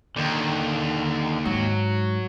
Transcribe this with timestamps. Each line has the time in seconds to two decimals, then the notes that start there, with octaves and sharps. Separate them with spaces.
0.16 D#2 D3 D#3
1.46 G#2 F#3